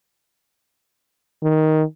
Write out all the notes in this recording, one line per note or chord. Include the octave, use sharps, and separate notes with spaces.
D#3